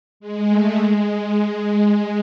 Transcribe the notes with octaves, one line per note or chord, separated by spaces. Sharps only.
G#3
A3
G#3